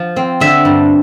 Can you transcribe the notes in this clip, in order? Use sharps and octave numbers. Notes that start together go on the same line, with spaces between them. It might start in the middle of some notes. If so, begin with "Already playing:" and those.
Already playing: F3
C4
D3 E5
G2